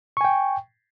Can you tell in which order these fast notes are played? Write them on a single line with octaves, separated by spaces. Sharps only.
C#6 G#5 G5